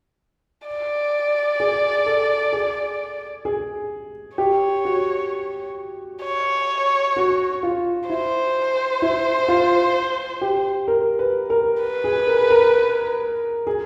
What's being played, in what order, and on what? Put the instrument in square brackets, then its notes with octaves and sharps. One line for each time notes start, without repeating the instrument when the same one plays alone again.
[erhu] D5
[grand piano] G#4
A4
G#4
G#4
[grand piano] G4 [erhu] C#5
[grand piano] F#4
[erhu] C#5
[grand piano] F#4
F4
[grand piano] E4 [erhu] C5
[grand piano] E4
F4
G4
A#4
B4
A#4
[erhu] B4
[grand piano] G#4
A#4
A#4
G#4